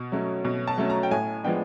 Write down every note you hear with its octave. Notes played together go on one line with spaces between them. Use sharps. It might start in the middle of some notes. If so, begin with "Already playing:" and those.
Already playing: B2
F#3 A3 C#4
B2
A5
F#3 A3 C#4
A#5
G5
A2 G#5
F3 G#3 B3 D4 G5